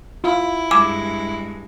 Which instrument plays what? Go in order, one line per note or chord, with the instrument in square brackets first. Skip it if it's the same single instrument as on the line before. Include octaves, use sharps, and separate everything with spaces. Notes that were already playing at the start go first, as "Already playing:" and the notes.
[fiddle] E4 [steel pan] F4
[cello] G2 G#3 [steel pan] G#5 E6 [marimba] D6